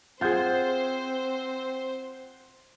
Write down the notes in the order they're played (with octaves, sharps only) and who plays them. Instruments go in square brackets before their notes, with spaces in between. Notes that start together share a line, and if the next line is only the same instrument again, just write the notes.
[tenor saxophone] C4 [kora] F4 G#4 [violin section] C5 [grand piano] F#5 G6